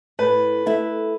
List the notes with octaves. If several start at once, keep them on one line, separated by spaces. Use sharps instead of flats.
A2 B4
A3 E4